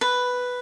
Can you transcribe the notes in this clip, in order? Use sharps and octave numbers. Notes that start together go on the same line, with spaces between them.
B4